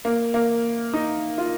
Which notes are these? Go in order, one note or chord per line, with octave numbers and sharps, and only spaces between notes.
A#3
A#3
D#4
F4